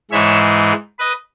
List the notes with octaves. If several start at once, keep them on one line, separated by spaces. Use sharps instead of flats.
G#2 E3 G#3 C#5 E5
B4 D#5